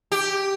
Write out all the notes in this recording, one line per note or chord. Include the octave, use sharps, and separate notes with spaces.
G4